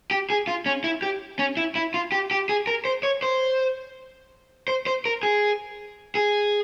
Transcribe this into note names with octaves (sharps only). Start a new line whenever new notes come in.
G4
G#4
F4
C#4
E4
G4
C#4
E4
E4
F4
G4
G4
G#4
A#4
C5
C#5
C5
C5
C5
A#4
G#4
G#4